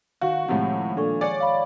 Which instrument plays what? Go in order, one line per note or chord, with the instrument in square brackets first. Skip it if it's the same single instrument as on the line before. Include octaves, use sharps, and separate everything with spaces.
[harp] D#3 [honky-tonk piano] F#4 [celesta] F5
[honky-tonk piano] A2 C3 [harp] D#3 F3 G#3 [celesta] F#5
[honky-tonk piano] A#2 [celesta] D4 A4 C#6
[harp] G#4 C#5 F#5 [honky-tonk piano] D5 [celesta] G#5
[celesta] F5 B5